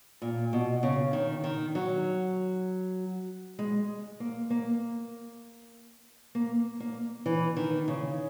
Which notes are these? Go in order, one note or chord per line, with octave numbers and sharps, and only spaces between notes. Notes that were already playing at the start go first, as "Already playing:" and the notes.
A#2
B2
C#3
D#3
D#3
F#3
G#3
A#3
A#3
A#3
A#3
E3
D#3
C#3